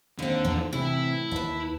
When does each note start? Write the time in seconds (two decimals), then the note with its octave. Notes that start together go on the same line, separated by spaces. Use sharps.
0.19 D#2 D3 C4
0.45 E2 F3
0.73 A2 C3 E3 C4 E4
1.31 D#2 B4 A5